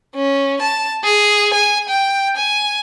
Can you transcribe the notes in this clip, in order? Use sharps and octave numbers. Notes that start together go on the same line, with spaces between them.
C#4
A5
G#4
G#5
G5
G#5